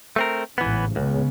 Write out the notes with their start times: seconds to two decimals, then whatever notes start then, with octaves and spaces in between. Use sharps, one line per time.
0.16 A3 C4 A#4
0.58 A1 G#2 C#3 E3 B3
0.96 C#2 C#3 G#3 B3